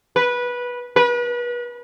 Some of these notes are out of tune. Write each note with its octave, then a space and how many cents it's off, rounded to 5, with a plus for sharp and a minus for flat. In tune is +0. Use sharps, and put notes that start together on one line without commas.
B4 -15
B4 -35